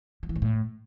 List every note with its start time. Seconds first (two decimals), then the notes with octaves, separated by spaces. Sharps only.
0.23 F3
0.29 E3
0.36 G#2
0.42 A2